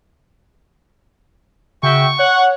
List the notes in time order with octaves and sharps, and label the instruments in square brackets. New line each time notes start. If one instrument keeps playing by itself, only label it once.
[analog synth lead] C#3 [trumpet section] F#4 E5 G5 [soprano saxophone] C#6
[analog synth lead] C#5 [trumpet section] F#5